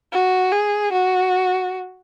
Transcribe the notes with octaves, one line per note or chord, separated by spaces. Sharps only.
F#4
G#4
F#4